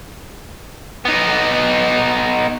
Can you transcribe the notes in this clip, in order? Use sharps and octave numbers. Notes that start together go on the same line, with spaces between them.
B3 D#4